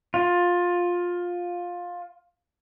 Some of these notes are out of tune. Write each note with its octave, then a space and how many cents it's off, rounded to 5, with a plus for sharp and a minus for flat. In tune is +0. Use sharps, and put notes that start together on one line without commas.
F4 +15